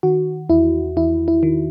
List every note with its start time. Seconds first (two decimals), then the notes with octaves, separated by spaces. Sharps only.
0.03 D#3 F#4
0.49 E2 E4
0.96 E2 E4
1.28 E4
1.43 D#3